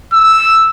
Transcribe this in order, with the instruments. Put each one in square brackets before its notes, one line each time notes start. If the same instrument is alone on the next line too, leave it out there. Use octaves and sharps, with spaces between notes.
[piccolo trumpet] E6